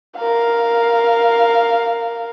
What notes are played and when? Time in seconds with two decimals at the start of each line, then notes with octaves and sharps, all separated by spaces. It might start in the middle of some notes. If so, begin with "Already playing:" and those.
0.17 A#4 F5